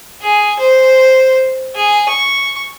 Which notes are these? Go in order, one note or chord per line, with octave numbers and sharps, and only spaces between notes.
G#4
C5
G#4
C#6